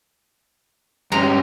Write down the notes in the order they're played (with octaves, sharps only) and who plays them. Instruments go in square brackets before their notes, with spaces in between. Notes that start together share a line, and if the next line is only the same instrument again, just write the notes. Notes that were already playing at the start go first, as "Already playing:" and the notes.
[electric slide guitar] G2 C#4 G4 [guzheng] G#3 A#5